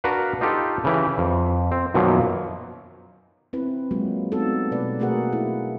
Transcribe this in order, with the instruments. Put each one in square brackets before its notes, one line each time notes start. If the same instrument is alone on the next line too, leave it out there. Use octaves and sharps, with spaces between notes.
[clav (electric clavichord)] D4 F#4 A#4 B4 F5
D#4 F4 G4 A4
C#3 E3 G4
F2
C4
F#2 B2 D#3 F3 F#3 A#3
[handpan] C4 E4 B4
F#3 G#3 A#3 F4 F#4 G#4
A3 B3 C4 D#4 F#4 A4
B2 A3 B4 D5
A3 A#3 F#4 G#4 A#4 F#5
E4